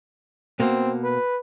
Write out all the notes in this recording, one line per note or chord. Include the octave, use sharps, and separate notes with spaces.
B2 A#3 C4
B4